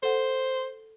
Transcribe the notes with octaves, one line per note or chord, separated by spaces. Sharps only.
A4 C5 F#5